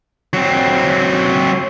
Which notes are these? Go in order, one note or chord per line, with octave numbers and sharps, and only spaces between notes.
F#3 C4